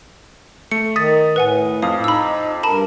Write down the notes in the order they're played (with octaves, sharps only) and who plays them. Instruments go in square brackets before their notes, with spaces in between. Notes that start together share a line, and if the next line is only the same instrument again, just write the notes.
[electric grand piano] A3 [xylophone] C#7
[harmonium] D#3 [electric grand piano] D#6 [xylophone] A6 B6
[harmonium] A2 [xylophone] B4 F#5 G#5
[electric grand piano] F2 F5 [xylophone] D#6
[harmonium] D#4 [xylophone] B5 E6
[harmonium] G2 A#4 [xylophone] A5 B5